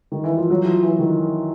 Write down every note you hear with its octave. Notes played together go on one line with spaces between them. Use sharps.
D#3
E3
F3
F#3
E3
F3
E3
D#3